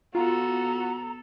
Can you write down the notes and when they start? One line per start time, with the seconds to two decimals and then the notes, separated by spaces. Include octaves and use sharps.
0.15 B3 F4 F#4 A4 A#5